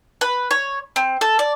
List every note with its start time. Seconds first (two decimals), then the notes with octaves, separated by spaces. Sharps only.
0.21 B4
0.51 C#5
0.96 C4
1.21 A4
1.39 D5